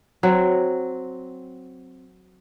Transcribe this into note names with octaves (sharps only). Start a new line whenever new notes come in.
F#3 C4